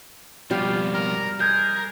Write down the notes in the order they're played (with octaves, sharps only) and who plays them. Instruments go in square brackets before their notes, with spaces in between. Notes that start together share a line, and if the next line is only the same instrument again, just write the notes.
[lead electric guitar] F2 B2 [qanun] G3 G4 [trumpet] F4
[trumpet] A#4
[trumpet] G#3 [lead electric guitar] A#4 [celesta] G6 G#6